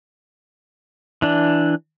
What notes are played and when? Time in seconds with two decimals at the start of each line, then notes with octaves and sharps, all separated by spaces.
1.22 E3 D4